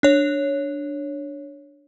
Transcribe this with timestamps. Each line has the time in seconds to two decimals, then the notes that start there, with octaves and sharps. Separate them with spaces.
0.03 D4 C#5